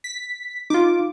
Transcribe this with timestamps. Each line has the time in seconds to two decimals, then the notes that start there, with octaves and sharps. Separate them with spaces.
0.04 B6
0.70 D#4 F4 D6